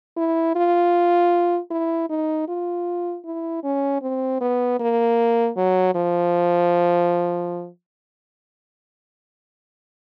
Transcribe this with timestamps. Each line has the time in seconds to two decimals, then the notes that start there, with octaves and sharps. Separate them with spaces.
0.17 E4
0.56 F4
1.71 E4
2.10 D#4
2.48 F4
3.25 E4
3.64 C#4
4.02 C4
4.41 B3
4.80 A#3
5.57 F#3
5.95 F3